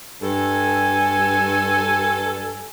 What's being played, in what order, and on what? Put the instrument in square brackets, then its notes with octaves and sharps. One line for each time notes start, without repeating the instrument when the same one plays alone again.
[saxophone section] G2 A4 [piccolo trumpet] G#5